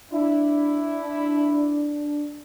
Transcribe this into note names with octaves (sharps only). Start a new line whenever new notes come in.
D4 E4